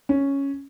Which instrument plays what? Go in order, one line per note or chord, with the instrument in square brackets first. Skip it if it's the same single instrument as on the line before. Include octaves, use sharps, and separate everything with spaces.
[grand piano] C#4